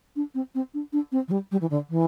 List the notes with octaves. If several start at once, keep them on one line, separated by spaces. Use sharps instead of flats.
D4
C4
C4
D4
D4
C4
E3
G3
G3
E3
D3
E3